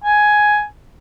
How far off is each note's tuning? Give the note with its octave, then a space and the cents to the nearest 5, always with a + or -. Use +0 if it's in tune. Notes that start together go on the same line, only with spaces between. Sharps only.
G#5 +10